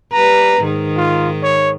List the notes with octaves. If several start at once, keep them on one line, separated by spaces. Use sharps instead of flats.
G3 B4 A#5
G#2 D#3
F4
C#5